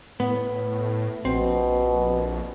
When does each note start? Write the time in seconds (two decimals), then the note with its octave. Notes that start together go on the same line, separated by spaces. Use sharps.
0.20 A2 B3
1.25 A#1 B2 C4